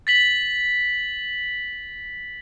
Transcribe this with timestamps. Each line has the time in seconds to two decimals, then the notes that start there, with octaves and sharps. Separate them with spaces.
0.07 A6 B6 F#7